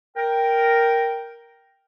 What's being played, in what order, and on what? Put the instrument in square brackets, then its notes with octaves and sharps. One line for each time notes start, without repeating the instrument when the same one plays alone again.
[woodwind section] A#4 G5